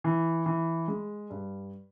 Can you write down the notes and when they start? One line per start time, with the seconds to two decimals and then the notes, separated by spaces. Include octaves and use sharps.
0.04 E3
0.46 E3
0.88 G#3
1.30 G2